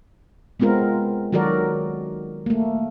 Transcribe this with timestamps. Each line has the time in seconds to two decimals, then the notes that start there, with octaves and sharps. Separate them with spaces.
0.60 G#3 B3 C4 F4 A#4
1.32 D#3 F#3 F#4 A4 A#4 D5
2.46 A3 A#3